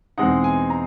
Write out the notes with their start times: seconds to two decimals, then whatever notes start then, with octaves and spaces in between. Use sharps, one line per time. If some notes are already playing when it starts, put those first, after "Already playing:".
0.18 E2 B2 G#3 C4 D#4 F#5
0.44 G#5
0.70 A#5